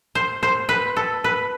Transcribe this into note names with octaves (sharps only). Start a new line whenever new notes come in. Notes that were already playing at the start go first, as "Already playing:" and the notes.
C5
C5
B4
A4
B4